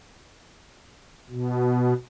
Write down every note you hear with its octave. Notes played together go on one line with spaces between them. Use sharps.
B2